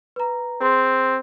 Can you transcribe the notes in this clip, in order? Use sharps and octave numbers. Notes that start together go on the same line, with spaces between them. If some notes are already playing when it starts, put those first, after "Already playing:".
B4 A#5
C4 G#4 C6